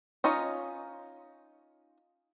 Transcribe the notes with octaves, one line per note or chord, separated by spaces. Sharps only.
C#4 D#4 F4 C#5 D#5